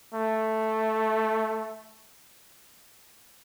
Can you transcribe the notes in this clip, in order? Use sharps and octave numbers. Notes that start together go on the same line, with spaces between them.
A3